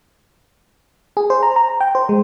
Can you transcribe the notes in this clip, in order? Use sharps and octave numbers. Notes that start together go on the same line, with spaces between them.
G#4
C5
A#5
A#5
G5
C5
G#3